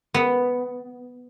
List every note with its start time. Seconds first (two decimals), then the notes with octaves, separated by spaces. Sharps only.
0.14 B3